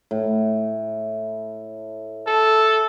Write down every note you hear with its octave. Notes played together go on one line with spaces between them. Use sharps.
A2
A4